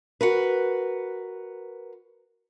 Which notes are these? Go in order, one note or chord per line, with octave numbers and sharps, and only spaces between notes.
F#4 A#4 B4